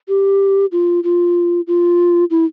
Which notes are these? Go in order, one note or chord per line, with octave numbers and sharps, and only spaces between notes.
G4
F4
F4
F4
E4